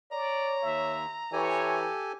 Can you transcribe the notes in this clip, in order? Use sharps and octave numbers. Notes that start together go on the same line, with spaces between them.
C#5 D5 A#5
D#2 E5
E3 G4 A4 C#5 G#5